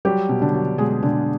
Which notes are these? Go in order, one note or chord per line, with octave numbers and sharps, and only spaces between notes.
F#3 G3 G4
B2
D3 D4
F#3
B2 G#3 G#4
B2 D3 D4